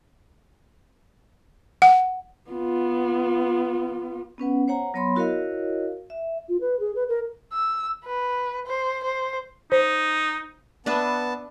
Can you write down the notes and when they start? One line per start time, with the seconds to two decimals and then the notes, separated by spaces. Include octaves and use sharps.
1.82 F#5
2.50 B3 F4
4.38 B3 C#4 B4 F#5
4.68 C5 C#5 F#5 A#5
4.94 F#3 B3 C#5 B5 C6
5.16 E4 F#4 A#4 C#5 D#5 F5
6.10 E5
6.49 F4
6.61 B4
6.80 G#4
6.96 B4
7.09 A#4
7.53 E6
8.05 B4
8.67 C5
9.04 C5
9.72 D#4 C5
10.86 B3 D4 B4 E5 A5